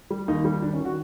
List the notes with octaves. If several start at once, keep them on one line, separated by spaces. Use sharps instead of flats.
G3
D#2 D#4
G3
D#3 D4
C#4
D#3
F#4